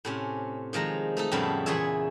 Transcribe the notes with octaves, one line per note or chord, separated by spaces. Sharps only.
A2 C3 C#4
D#3 F3 G#3 A#5
A3 D#4 A4
F2 A2 C#3 G3 B3 E4
E2 A#2 G#4 C#5 E5